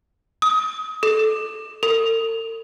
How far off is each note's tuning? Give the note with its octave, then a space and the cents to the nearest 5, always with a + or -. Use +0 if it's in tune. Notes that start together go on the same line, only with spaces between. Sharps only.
D#6 +30
A4 -20
A4 +45